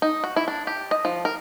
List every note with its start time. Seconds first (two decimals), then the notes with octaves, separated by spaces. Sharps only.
0.02 D#4
0.24 F#4
0.36 E4
0.48 D4
0.67 G4
0.91 D#5
1.05 F3
1.25 A#4